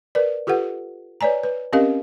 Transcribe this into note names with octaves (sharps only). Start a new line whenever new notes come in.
A#4 B4 D5
F4 G4 A4 B4 F#5
B4 C#5 D5 G#5 A#5
B4
C4 C#4 G4 A#4 D#5 F5